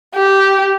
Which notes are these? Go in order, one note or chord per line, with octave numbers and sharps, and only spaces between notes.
G4